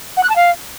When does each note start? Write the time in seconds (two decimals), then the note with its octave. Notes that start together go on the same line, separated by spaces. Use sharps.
0.16 F#5
0.23 F#6
0.29 A5
0.35 F5